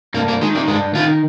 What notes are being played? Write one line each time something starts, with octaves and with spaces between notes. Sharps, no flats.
G2 A#3
A#3
D#3 G#3
G3
G2 G#3
D#3 F4